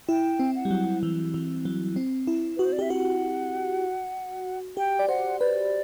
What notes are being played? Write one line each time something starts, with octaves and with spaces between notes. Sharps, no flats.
E4 G5
C4
F#5
G3
F#3
E3
E3
F#3
C4
E4
F#4 B4
C5
D5
G4 E5
F#4 F#5
G4 G5
D5
C5 F#5
B4 D5